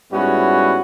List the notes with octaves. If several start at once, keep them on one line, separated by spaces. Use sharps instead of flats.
G#2 G3 B3 C#4 E4 F#4